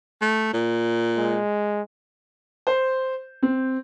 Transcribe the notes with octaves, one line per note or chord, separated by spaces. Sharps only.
A3
A#2
G#3
C5
C4